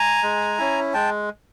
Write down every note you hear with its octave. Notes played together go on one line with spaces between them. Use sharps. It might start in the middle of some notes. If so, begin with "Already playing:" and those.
Already playing: G#5 A#5
G#3
C#4 E4
G#3 G5 A5